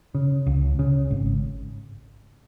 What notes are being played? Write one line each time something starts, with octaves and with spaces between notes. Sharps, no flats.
C#3
C#2
C#3
G#1